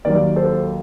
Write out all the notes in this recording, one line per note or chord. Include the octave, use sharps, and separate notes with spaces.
D#2 D#3 F#3 A#4 D5
A4 C5